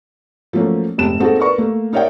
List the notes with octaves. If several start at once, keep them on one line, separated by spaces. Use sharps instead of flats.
F3 F#3 A3 A#3 C#4
F1 G#2 C3 A5 E7
G#3 A#3 C4 D#4 F#4 A4
A#4 B4 D5 C#6
A3 A#3
D#4 A#4 C#5 D5 E5 G5